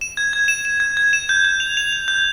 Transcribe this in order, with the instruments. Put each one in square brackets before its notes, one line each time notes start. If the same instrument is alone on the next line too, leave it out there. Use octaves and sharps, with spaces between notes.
[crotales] E7
G#6
G#6
E7
E7
G#6
G#6
E7
G6
G6
F7
F7
F7
G6